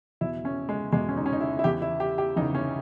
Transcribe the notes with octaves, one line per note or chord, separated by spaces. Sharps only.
E2 B2 E4
C#4
G#3
E2 B2 G#3
C#4
D#4
C#4
D#4
E4
E4
E2 C#3 E3 G4
E4
G4
G4
E2 C#3 E3 D#4
C#4